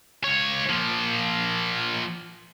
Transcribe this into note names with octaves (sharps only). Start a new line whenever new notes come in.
C#2 C#5
F3 A#3